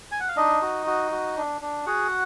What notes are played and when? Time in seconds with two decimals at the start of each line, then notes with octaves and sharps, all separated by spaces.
0.11 G#5
0.20 F#5
0.28 F5
0.36 D4 D#4 D#5
0.62 F#4
0.86 F#4
1.11 F#4
1.37 D4
1.61 D4
1.86 F#4 G#4 F#5